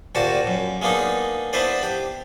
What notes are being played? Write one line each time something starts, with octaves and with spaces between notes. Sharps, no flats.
D2 A#2 F#4 G4 A5
F#2
G#3 A#3 B3 D4 D#4
B3 D4 E4 B4 C5 D5
G4